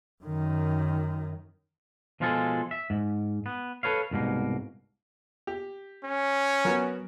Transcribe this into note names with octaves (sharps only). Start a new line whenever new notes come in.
F#2 D#3
B2 F3 G#3 F4 G#4 A4
E5
G#2
B3
A4 B4 C#5 F5
C2 G#2 B2 A#3
G4
C#4
F#3 B3 F#4 A#4